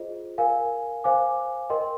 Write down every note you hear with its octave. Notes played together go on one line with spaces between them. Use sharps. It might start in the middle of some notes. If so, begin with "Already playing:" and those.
Already playing: F4 G#4 C5 D#5
A#4 F5 G#5
C5 F5 G#5 D6
A#4 D#5 G5 C6